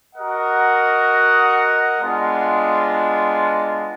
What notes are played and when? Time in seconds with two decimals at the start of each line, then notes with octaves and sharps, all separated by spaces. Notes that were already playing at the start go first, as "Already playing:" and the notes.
0.14 F#4 A#4 D#5 F#5
2.01 G#3 B3 D4 F4